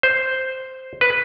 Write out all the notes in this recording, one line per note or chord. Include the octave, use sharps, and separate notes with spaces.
C5
B4